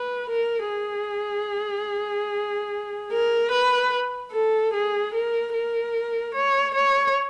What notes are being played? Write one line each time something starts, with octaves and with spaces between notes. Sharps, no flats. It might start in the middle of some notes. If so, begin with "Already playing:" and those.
Already playing: B4
A#4
G#4
A#4
B4
A4
G#4
A#4
A#4
C#5
C#5